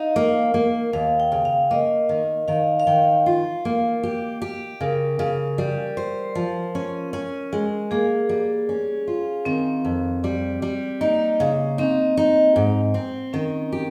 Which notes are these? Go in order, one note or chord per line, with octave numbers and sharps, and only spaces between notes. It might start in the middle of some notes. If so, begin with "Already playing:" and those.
Already playing: D#4 F5
A#3
A#3
D#2 F5
G5
C#3
F5
A#3 D#5
D#3
D#3 F5
F5
D#3 G5
F4
A#3
G4
G4
C#3 A#4
C#3
G3
C5
F3
C#4
C#4
G#3
A#3 G#4
G3
C#4
F4
D#3 C4
F2
G3
G3
A#3 D#4
C#3
C4 D#4
D#4
G#2
C4
D#3 C#4
G4